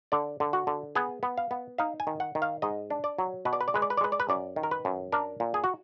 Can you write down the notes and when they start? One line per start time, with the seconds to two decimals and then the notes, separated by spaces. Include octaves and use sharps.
0.12 D3 D5
0.40 D3
0.53 F#4
0.67 D3
0.95 B3 G#4
1.23 B3
1.38 F5
1.51 B3
1.78 D#4 F5
2.00 G#5
2.07 D#3
2.20 F#5
2.35 D#3
2.42 F5
2.62 G#2 D#5
2.90 D4
3.04 D5
3.19 F#3
3.45 B2 B4
3.53 D5
3.61 B4
3.68 D5
3.74 G#3 B4
3.82 D5
3.90 B4
3.97 D5
4.01 G#3 B4
4.12 D5
4.20 B4
4.29 F#2 D5
4.56 D#3
4.63 A#4
4.71 B4
4.85 F#2
5.12 D4 A#4
5.40 A#2
5.54 G#4
5.64 F#4